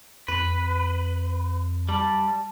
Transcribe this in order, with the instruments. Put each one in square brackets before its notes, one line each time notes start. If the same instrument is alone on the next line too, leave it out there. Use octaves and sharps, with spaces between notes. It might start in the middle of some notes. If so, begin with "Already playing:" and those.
[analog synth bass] F2 [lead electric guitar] B4
[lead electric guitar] G3 [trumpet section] A5